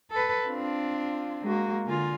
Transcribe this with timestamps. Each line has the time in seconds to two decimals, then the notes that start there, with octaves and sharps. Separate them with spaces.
0.11 A4 B4
0.47 C4 D4 F4
1.42 G#3 A#3 F#4
1.86 D3 A#3 F4 G#5